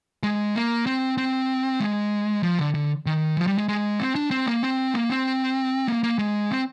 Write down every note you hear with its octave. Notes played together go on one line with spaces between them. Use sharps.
G#3
A#3
C4
C4
G#3
F3
D3
D3
D#3
F3
G3
G#3
G#3
C4
D4
C4
A#3
C4
A#3
C4
A#3
A#3
G#3
C4